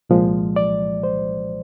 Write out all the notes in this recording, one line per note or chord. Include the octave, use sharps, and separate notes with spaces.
C2 A#2 F3 G#3
D5
C5